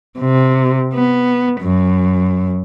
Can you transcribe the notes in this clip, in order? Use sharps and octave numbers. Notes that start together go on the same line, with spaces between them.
C3
B3
F#2